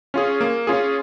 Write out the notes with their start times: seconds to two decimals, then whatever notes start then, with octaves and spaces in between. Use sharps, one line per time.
0.14 C#4 F4 G#4
0.41 A#3
0.67 C#4 F4 G#4